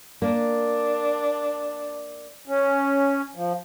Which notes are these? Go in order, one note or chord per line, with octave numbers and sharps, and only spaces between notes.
A#3 D4
C#4
F3